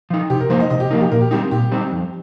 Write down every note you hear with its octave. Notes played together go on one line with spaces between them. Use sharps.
F3 D#4
C3 G4
A#4
F3 A#3 D#4 C5
D#5
C3 D#5
G4
F3 A#3 D#4 A#4
G4
A#2 A#4
G4
G3 C4 D#4 G4
A#2 G4
G3 C4 D#4
F2